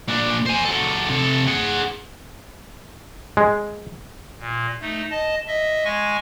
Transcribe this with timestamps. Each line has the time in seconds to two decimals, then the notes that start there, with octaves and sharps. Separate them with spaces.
0.08 A#2 D4
0.46 C5 G#5
0.65 F#3 A4
1.10 C3 A4
1.48 G#4 F#5
3.37 G#3
4.39 A#2
4.81 A3 D#4
5.10 D#5 A5
5.47 D#5 E5
5.84 G#3 G#5 C#6